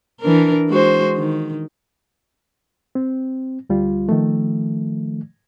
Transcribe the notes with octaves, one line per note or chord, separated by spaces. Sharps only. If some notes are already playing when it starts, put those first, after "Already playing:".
E3 D4 A#4
G#3 F#4 C5
D#3
C4
D2 G3 F4
D#3 F3 A3